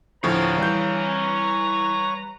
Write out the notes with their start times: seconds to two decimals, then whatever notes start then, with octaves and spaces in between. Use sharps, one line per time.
0.24 D2 A2 F3 B4 C#5 F5 A#5
0.58 E3 G3 G6